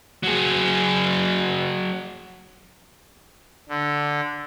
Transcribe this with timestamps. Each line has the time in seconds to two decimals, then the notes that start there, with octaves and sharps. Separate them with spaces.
0.23 F#3 G#4
3.69 D3